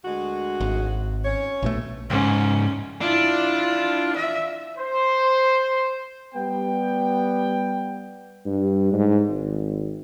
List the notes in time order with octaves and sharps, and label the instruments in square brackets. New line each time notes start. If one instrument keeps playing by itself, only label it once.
[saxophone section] D2 G#3 F#4
[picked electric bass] G#1
[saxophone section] C#4 C#5
[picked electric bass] A#1 B2 A3
[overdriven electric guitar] C#2 G#2 [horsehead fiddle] C#4
[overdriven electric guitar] D4 [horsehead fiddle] E4 F4
[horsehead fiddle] E5
[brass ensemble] C5
[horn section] G3 B3 G5
[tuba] G2
G#2
G#1